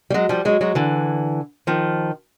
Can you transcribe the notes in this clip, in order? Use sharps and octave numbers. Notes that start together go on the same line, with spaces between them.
G3
F#3 G#3
F3 G3
F#3 G#3
F#3 G#3
D3 E3
D#3 F3